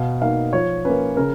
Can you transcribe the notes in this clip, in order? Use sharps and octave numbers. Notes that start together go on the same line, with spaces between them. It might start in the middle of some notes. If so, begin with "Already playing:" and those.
Already playing: B2 F5
A#3 D#4 F5
F3 C#5
A#3 C#4 B4
C#3 A#4